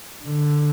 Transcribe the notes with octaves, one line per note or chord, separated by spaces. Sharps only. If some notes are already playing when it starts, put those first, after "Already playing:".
D3